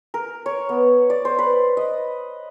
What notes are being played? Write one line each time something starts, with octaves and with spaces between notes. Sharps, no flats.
A#4
C#5
B3
D5
C5
B4
D#5